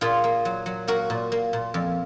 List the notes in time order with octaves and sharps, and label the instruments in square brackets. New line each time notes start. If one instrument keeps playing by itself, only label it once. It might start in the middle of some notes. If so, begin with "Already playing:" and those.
[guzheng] A#2 F4 G#4
A#3
F#3
F#3
A#3 F#4 A#4
A#2
A#3
A#2
F2